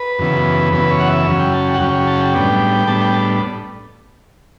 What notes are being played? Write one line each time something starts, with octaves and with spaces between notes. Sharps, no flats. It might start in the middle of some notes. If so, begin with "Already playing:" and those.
Already playing: B4
F#2 C#3 E3 B3
F#2 C#3 E3 B3 B4
C#5
F#5
E5
F#2 C#3 F#3 C#4
G5
A5
G5
F#5
F#2 C#3 F#3 C#4 G5
G5
A5
G5
A2 G3 B3 D4
A2 G3 B3 D4 A5
G5
A5